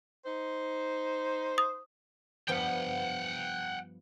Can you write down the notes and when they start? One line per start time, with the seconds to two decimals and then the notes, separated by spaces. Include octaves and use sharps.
0.25 D#4 C5
1.58 D#6
2.48 G2 F3 B3 F#5 G5